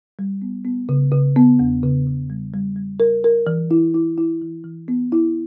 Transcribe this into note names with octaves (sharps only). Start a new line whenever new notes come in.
G3
B3
B3
C#3
C#3
B3
E2
C#3
C#3
G3
G3
G3
A#4
A#4
E3
E4
E4
E4
E3
E3
B3
E4